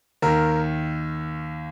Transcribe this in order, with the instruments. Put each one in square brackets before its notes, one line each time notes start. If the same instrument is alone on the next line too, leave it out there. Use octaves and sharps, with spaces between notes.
[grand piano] D#2 D#3 A#4